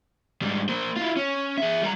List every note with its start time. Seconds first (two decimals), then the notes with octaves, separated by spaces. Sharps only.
0.42 G#2 G3
0.69 A#3 C5
0.96 E4 F4
1.17 C#4
1.58 G#4 E5
1.82 G3 A#5